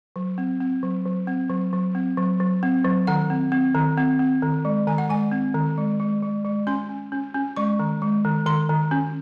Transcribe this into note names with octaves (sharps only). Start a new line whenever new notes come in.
F#3
C4
C4
F#3
F#3
C4
F#3
F#3
C4
F#3
F#3
C4
F#3
D#3 F#5
C4
C4
D#3
C4
C4
D#3
G#3
D#3 G#5
F#5
G#3 G#5
C4
D#3
G#3
G#3
G#3
G#3
C#4 C6
C#4
C#4
C#4
G#3 C#6
D#3
G#3
D#3
D#3 C6
D#3
C#4